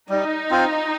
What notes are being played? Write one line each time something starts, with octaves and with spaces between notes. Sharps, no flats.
G3 D#4
C4 F4 C5